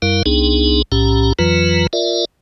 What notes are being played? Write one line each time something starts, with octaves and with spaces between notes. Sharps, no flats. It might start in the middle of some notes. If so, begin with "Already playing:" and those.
F#2 G3 E4 A#4 F5
C2 B3 D4 D#4 G#4
B1 A2 C#4 G4 A#5
F2 E3 F#3 F4 B4 A#5
F4 A#4 D5 E5